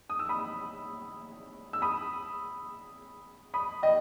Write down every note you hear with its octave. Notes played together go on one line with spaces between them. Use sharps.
D#6
E6
B5 D#6
E6
B5 D#6
B5 D#6
D#5 G5